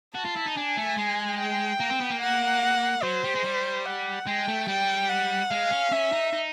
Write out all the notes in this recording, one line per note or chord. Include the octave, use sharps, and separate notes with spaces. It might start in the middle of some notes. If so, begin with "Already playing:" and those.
F#4 A5
F4
E4
D#4
D4 G#5
A3
G#3
G5
A#3
C4
B3
A#3
F#5
F#3 C5
G3
G#3
G3
F#5
G#3 G5
A3
G3 G5
F#5
G#3 F5
C#4
C#4 E5
D#4
D#4